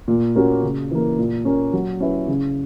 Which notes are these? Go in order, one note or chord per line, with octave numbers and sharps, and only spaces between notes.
A#2
A#3 C#4 F#4
C#3
E3 A#3
A#2
A#3 C#4
F#3
C#4 E4 B4
C#3